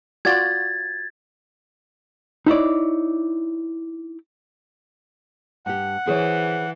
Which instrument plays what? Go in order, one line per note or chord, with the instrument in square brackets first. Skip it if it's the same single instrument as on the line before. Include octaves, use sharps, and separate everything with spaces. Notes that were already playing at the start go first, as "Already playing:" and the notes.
[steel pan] F4 F#4 D5 [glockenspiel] G#6 A6
[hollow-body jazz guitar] D#4 E4 C#5 D5
[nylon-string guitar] G2 G4 [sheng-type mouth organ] F#5
[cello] E3 [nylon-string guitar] G#4 C5 C#5